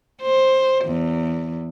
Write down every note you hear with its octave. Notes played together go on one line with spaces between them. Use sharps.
C5
E2